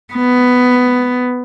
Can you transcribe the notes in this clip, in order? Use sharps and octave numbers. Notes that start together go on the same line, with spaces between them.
B3